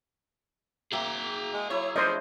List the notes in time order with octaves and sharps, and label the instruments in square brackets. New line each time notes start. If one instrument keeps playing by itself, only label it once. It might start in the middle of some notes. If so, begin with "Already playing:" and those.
[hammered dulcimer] A#3 E5 A#5 [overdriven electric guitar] G#4 G5
[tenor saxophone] G#3
[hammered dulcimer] F#3 E4 [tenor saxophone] C#5
[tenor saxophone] F3 [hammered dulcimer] A3 D4 [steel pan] C5 D#5